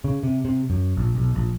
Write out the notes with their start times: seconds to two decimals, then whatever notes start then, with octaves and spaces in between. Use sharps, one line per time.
0.04 C#3
0.23 C3
0.45 C3
0.70 F#2
0.97 A#1
1.15 B1
1.35 A#1